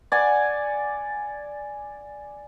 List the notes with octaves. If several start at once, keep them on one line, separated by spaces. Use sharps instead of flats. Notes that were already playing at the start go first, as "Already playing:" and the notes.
D5 F#5 G#5